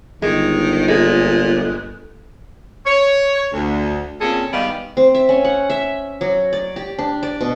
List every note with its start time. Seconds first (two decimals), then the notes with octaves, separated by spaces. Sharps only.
0.22 G1 D#3 G#3
0.88 A#2 G#3 A4
2.86 C#5
3.53 D2
4.21 A#2 C4 C#4 G#4 A4
4.52 G#2 D#3 G3 B3 D5 F5
4.97 C4
5.15 E5
5.29 C#4
5.45 F#5
5.70 E5
6.21 F#3
6.53 D5
6.76 G4
6.99 D4
7.23 D5
7.41 B2